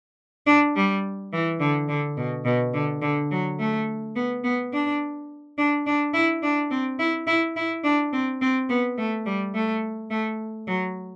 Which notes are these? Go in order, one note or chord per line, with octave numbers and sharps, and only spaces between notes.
D4
G3
E3
D3
D3
B2
B2
D3
D3
F#3
A3
B3
B3
D4
D4
D4
E4
D4
C4
E4
E4
E4
D4
C4
C4
B3
A3
G3
A3
A3
F#3